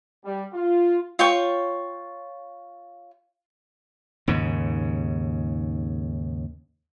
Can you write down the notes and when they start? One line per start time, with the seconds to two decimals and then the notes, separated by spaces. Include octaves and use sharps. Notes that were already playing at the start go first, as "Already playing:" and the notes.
0.25 G3
0.54 F4
1.19 F4 C#5 G5 C#6
4.28 D#2 G#2 C#3